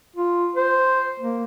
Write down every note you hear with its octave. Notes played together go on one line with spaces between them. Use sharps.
F4
C5
A#3